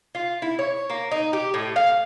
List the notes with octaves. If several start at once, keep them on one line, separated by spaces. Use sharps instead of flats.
F4
E4
C#5
A#3
D#4
G4
A2
F5